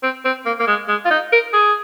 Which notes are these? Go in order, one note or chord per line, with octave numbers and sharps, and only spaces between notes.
C4
C4
A#3
A#3
G#3
G#3
F4
D#4
A#4
G#4